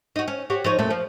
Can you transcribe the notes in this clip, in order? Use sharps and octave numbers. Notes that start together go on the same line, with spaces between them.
D#4 F#4
C#4
F#4 G4 C#5
F3 D#4 C#5
F#2 A#2 A3
F3